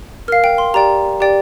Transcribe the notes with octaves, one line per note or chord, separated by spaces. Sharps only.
A#4 F5 F6
G5
C6
G4 D5 G5 A#5
G4 D5 G5